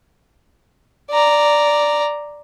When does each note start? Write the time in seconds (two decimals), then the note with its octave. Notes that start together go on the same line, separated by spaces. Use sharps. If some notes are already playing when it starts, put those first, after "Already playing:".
1.11 D5 A#5